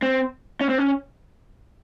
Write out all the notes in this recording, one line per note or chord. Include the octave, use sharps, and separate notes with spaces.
C4
C#4
C4
C#4